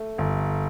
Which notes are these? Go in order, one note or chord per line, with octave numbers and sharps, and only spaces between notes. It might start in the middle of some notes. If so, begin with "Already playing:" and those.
Already playing: A3
G1